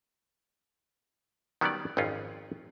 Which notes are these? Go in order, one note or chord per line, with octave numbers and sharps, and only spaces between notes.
D#3 F#3 G3 B3 C#4 D5
G#1 F2 C4 C#4 F4